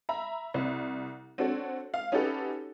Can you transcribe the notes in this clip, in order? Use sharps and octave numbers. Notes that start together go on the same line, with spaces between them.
E5 A#5 B5
C2
C4 D4 F#4 A4 C#5
F5
C#4 D#4 F#4 G4 A4 B4